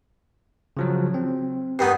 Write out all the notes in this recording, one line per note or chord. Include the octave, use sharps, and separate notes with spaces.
C#3 F3 F#3
C4
G2 D#3 B3